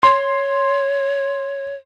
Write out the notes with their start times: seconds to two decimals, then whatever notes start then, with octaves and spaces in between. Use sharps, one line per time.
0.03 C#5 C6